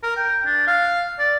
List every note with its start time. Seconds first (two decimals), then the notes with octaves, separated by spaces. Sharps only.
0.03 A#4
0.17 G5
0.46 D4
0.67 F5
1.19 D5